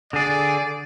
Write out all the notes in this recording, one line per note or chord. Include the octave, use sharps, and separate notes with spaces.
D3 G#4 D5